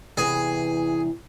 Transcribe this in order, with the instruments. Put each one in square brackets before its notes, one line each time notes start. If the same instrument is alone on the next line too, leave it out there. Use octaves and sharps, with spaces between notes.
[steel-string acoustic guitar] E2 C3 E3 [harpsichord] G#4